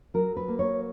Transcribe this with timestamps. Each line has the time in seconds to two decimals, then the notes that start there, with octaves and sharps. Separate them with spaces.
0.14 F#3 A#4
0.37 B4
0.48 A#3
0.59 C#5